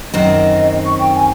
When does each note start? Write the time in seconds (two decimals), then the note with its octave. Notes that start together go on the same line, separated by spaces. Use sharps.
0.14 F#2 D#3 C4 D#5
0.86 C#6
1.00 G5
1.16 G#5